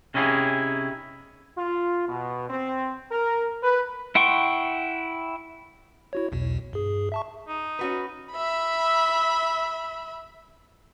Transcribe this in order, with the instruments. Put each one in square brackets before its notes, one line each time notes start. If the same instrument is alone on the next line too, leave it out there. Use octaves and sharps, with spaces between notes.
[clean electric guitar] C3 C#4 D#4 E4 F#4 G#4
[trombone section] F4
B2
C4
A#4
B4
[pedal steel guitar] E4 F#5 G5 C6 C#6
[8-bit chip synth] E4 F#4 C#5
B1 E2 B2
G2 G#4
E5 A5 C#6
[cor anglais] D#4
[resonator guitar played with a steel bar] C#4 F#4 B4
[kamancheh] E5 B5